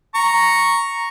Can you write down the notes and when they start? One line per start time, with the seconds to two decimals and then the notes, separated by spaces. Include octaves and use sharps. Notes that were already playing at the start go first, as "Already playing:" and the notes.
0.15 A#5 C#6